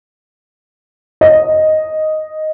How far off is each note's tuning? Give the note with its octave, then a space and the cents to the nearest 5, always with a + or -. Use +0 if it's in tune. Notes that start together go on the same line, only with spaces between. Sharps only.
D#5 +0